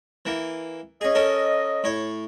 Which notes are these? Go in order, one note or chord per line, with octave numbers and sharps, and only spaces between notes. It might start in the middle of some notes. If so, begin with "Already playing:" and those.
E3 A#3
C#4 G#4 D#5
C#4 A4 A#4
A2 C#5